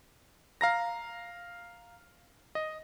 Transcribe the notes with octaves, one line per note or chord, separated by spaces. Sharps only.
F5 A#5 A#6
D#5